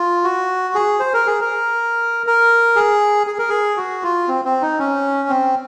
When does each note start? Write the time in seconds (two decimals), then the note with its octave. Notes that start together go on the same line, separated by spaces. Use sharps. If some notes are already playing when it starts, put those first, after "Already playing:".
Already playing: F4
0.24 F#4
0.75 G#4
1.00 C5
1.14 A#4
1.27 G#4
1.41 A#4
2.27 A#4
2.76 G#4
3.27 G#4
3.39 A#4
3.49 G#4
3.77 F#4
4.03 F4
4.28 C4
4.45 C4
4.61 D#4
4.79 C#4
5.29 C4